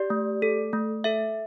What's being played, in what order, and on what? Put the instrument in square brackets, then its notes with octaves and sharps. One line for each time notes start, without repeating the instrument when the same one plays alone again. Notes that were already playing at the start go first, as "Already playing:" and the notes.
Already playing: [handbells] G4 D5
A3
A4
A3
A4 E5